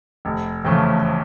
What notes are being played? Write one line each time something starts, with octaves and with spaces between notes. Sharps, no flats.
F1
E2 C#3 F3 A3